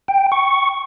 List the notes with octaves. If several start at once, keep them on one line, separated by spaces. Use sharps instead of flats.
G5
C#6